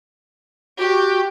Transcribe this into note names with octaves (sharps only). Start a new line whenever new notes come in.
F#4 G4